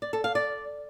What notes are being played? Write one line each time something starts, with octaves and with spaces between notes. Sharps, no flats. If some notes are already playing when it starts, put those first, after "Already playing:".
D5
A4
F5
D5